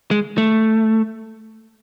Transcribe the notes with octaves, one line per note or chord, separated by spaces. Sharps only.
G#3
A3